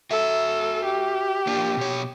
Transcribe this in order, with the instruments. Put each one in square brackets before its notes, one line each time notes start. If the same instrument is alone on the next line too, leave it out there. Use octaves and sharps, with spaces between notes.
[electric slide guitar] F#4 E5 [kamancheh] A4
[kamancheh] G4
[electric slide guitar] A#3 D4 F4
B2 C#5